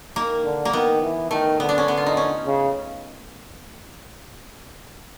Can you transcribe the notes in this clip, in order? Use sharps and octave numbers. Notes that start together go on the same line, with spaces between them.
D#3 A#3
D3
A#3
D#3 B3
E3
D#3 A3
D3 B3
D4
C#4
B3
F4
D#4
C#4
C#3